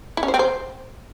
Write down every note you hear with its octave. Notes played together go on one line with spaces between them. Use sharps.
E4
C#4
C5
C4
C5